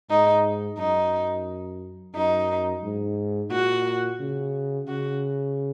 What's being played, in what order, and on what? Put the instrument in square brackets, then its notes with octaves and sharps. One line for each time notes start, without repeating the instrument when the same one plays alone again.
[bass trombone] G#2 [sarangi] D#4
[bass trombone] F#2 [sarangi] D#4
[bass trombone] F#2 [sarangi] D#4
[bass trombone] G#2
[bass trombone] A#2 [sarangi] F#4
[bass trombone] C#3
[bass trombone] C#3 [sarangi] F#4